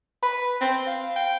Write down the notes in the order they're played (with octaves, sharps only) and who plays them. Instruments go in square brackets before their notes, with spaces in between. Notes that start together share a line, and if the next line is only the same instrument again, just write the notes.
[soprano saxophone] B4 [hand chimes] B5
[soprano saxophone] C4
F5
G5